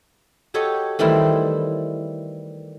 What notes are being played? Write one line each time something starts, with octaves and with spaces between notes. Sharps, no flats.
F#4 G4 A4 C#5 D#5
D#3 E3 G3 A3 C4 E4